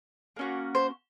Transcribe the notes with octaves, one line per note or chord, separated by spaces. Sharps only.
A#3 C#4 F#4
C5